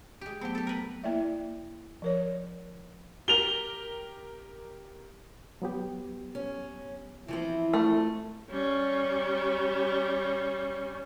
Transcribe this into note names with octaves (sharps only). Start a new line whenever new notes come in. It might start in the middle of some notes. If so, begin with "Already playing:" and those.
G#3 G4
F#3 A3 B3 C4 G4
G4 A4
A#4 B4
A#3 E4 D5 E5
F3 A#4 C#5
G4 A#4 F7 G7
F#3 B3 G4
C#4
E3 F3 C4 E4
A3
G3 C#4